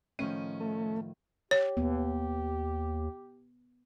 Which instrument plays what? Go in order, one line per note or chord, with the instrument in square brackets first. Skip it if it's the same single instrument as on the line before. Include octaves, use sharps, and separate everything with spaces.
[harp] A2 D#3 F3 [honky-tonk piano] C#4 D#7
[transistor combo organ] A3
[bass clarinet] G4 [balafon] C#5
[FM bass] D#2 [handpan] B3